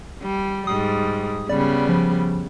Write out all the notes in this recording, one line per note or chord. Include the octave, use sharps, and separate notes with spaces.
G3
G#2 G3 D#6
C#3 G3 B3 D5
F3